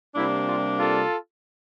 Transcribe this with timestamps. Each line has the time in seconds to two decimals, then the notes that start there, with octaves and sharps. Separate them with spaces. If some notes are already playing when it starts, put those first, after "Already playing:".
0.15 C3 G3 A#3 D4 E4
0.47 F4
0.78 F4 A4